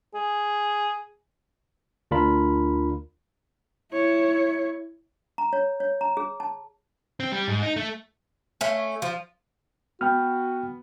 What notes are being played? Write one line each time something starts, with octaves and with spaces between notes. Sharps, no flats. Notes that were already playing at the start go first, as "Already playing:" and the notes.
G#4
D2 D4 F4 A#4 B5
E4 C#5
A#5
C#5
C#5
A#5
G#4
A5
C4
G3
G#2
D#4
A3
A3 C#4
F3
B3 F#4 G5 F6